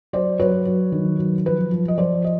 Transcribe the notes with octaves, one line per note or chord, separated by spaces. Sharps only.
F#3 C5 D5
F#3 B4 C#5
F#3
D#3
F#3
F3 B4
F3
D#5
F3 C5 D5
D#5